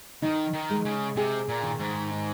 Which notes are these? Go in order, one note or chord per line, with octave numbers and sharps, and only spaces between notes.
D#3 D#4
D#3
G#3
C#3
C3 G#4
A#2
D#3
G#2
D#4